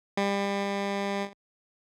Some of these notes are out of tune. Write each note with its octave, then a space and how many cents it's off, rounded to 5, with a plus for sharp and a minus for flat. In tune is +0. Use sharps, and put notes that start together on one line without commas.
G3 +30